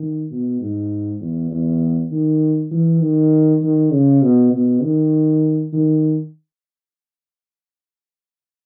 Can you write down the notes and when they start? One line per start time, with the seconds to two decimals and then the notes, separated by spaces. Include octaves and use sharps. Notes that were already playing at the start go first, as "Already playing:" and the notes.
Already playing: D#3
0.31 B2
0.61 G#2
1.20 E2
1.51 E2
2.11 D#3
2.71 E3
3.02 D#3
3.62 D#3
3.92 C#3
4.22 B2
4.53 B2
4.83 D#3
5.73 D#3